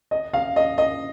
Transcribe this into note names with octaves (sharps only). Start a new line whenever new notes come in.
D#5
F5
D#5
D#5